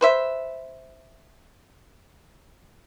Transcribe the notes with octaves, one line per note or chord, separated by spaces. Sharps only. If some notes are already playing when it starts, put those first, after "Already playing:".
B4 C5 E5